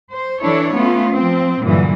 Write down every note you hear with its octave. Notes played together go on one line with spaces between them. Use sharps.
C5
E3 D4 E4 A4 C#5
A3 B3 C#4 F4
F3 C4
G2 A#2 D3 E3 F#3